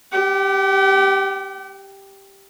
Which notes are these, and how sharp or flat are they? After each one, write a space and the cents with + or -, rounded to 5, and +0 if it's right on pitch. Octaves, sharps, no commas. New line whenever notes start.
G4 +0 G5 -45